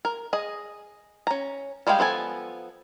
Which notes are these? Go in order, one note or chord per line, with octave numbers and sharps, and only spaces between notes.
A#4
G#4 D#5
C#4 A#5
G3 G#3 G#4 F5 G5
F3 B3 A4 G#5